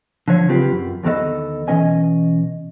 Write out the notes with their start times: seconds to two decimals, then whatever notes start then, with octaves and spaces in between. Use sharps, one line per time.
0.28 D3 F3 C#5
0.48 C#3 F#3 C4 F4 G4 B4
0.71 F#2
1.03 D2 D#3 B3 A4 D#5
1.68 B2 E3 C#4 D#5 G#5